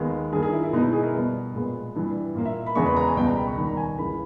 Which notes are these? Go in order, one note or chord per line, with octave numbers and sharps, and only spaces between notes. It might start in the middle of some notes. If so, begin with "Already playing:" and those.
Already playing: D#2 D#3 G#3 B3
G2 D#3 A#3 G#4
G#4
E4
E4
B2 G#3 B3 D#4
E4
G#4
A#4
B2 G3 B3
A#2 G#3 B3
G2 E3 G3
A#2 A#3
E5
B5
E2 C#3 G#3 B3 C#6
B5
A#5
G#5
C#2 B2 G3 B3 G5
A#5
B5
C#6
D#2 D#3 G3 A#3 B5
A#5
G#5
C#2 C#3 E3 A#3 B5